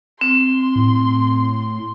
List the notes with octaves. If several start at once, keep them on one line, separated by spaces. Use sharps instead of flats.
C4 C6
A2